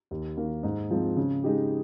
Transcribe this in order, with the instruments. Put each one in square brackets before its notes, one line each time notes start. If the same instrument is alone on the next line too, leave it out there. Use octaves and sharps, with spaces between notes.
[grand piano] D#2
D#3 A#3
G#2
F3 G#3 C4
C#3
G#3 D#4 G4